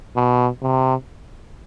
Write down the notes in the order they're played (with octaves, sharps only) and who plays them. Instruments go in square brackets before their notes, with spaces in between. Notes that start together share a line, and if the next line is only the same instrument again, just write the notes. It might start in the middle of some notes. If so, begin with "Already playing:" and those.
[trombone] B2
C3